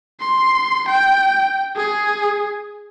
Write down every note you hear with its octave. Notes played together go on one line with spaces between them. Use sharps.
C6
G5
G#4